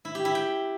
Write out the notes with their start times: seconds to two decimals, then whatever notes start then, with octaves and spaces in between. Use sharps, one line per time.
0.05 E4
0.15 G4
0.25 E4
0.35 G5